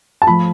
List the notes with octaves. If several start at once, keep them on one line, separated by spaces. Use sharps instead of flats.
A5
F3 A3 F4 B5